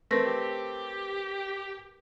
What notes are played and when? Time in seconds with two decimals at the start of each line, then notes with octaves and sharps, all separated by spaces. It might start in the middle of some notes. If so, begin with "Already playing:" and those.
0.11 A3 C4 A#4 B4 A#6
0.25 G4